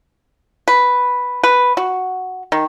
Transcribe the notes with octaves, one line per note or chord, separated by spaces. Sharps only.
B4
B4
F#4
D#3